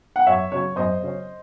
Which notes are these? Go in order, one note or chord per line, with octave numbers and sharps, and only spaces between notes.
F#5
F#2 C#5 E5
C#3 F#3 C#4 C#5
F#2 C5 D#5
C#3 F#3 C#4